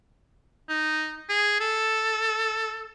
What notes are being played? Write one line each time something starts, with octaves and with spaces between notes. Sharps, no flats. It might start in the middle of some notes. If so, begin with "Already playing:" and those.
D#4
G#4
A4